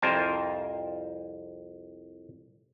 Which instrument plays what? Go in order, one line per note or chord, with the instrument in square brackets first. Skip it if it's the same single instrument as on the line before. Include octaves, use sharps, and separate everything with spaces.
[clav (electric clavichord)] C2 F2 A#4 C5 G#5 A5